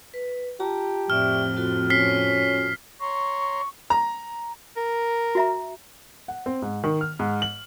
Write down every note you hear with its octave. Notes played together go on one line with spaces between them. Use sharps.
B4
F4 G4 A5 A#5
F2 A2 C3 D5 E5 C#6 F6
F4 F#4 A4
C#4 F6 B6 C7
C#5 A#5 C6 C#6
A#5
A#4
F#4 E5 A#5
F#5
C4
G#2
D#3
F6
G#2
F#7